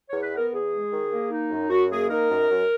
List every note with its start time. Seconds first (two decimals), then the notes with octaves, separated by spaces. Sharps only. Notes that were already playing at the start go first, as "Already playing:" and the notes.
0.08 E2 C#5
0.22 B4
0.33 B3 A#4
0.52 E2 G#4
0.72 G#3
0.92 D#3
1.11 A#3
1.30 D#4
1.50 F#2
1.70 F#2 F#4
1.91 A#3 G#4
2.10 D#4 A#4
2.30 F#2
2.50 F#2